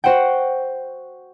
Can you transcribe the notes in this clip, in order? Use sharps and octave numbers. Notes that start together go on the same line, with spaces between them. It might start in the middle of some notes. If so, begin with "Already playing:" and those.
F#4 C5 F#5 G5